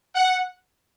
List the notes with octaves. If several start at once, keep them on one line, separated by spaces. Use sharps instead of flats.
F#5